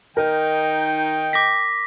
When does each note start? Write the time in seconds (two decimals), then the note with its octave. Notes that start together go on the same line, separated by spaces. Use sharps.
0.17 D#3 D#4 A#4 G5
1.33 D6 A#6 B6